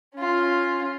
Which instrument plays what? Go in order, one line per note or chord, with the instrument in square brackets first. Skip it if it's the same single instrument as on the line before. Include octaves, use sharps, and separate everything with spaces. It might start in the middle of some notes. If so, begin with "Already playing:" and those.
[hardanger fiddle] C#4 F4